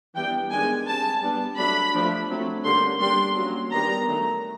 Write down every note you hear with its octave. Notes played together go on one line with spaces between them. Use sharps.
E3 G3 B3 D4 G5
D#3 G#3 B3 D4 G#5
G3 C4 A5
G3 B3 D4
F#3 A3 D4 B5
F3 A3 D4
F#3 A3 C4
D3 G3 A#3 C#4 C6
G3 B3 D4 C6
F#3 A#3 C#4
D#3 G3 B3 D4 A#5
D#3 F#3 A3